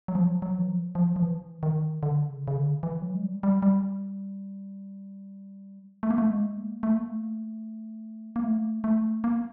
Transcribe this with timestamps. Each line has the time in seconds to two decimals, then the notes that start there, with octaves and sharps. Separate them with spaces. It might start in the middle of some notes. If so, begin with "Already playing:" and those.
0.08 F#3
0.15 F3
0.42 F#3
0.59 E3
0.69 F3
0.90 F#3
0.95 F3
1.16 F3
1.22 E3
1.63 D#3
2.03 D3
2.29 C#3
2.48 C#3
2.56 D3
2.83 E3
3.02 F#3
3.14 G#3
3.23 G3
3.43 G3
3.62 G3
6.03 A3
6.11 A#3
6.18 A3
6.30 G#3
6.57 A#3
6.83 A3
6.95 A#3
7.07 A3
8.36 A#3
8.44 A3
8.84 A3
9.24 A#3